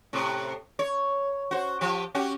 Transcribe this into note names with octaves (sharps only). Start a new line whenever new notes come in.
A2 C3
C#5
F#4 C5
F3 G4
C#4 F#4 G4